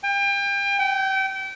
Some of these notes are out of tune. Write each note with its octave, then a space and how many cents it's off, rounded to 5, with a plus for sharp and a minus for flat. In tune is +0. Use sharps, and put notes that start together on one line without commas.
G5 +35
G5 -30